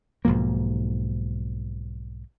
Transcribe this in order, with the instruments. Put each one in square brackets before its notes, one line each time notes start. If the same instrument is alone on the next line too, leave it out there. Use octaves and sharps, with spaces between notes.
[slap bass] B1 G#2 F3 A#3